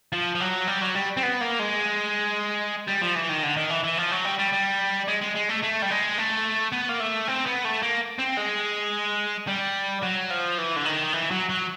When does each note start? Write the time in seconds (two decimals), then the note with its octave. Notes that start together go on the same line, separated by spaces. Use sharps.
0.12 F3
0.35 F3
0.40 F#3
0.67 G3
0.81 F#3
0.95 G3
1.17 C4
1.23 B3
1.41 A#3
1.59 G#3
2.87 G3
3.01 F3
3.15 E3
3.29 D#3
3.43 D3
3.56 D#3
3.70 E3
3.84 E3
3.97 F3
4.11 F#3
4.25 G3
4.39 G3
4.53 G3
5.08 G#3
5.21 G#3
5.35 G#3
5.49 A3
5.62 A3
5.82 G3
5.90 G#3
6.18 A3
6.72 B3
6.89 A#3
7.00 A3
7.27 C4
7.46 B3
7.64 A3
7.82 A#3
8.19 C4
8.37 G#3
9.47 G3
10.02 F#3
10.30 F3
10.58 E3
10.76 D3
10.85 D#3
11.13 E3
11.31 F#3
11.49 F#3